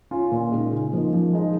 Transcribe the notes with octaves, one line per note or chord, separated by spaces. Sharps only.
C#4 F4
A#2
G#3 D#4
C#3
F3 A#3 D#4
F3
G#3 D#4 G#4